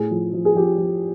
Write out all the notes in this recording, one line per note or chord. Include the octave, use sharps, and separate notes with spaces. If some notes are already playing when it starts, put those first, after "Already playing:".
Already playing: A2 G#4
F3
F3
G#4
F3 G4
F3